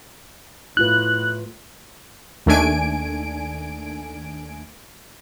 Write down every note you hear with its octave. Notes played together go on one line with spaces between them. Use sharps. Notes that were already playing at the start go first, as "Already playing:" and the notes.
A2 E4 F4 B4 F#6
D#2 D#3 A3 D4 G#5 D7